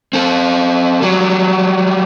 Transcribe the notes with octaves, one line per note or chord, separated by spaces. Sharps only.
C4 A4
F#3 G3